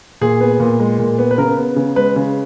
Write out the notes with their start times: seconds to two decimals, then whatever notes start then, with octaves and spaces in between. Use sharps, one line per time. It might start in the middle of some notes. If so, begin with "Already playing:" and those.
0.21 A#2 G#4
0.41 B3
0.60 A#2
0.80 G#3
0.99 A#2
1.18 B3
1.31 B4
1.38 C#3 A#4
1.58 B3
1.76 C#3
1.96 G#3 B4
2.16 C#3